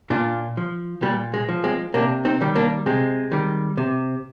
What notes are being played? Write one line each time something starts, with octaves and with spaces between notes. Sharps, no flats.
A#2 D4 F4
F3
A#2 G3
G#3
F3
G#3 C4
C3 A#3 D4
C4 D#4
D#3 G3
A#3 D4
C3 G#3 C4
D#3 G3
C3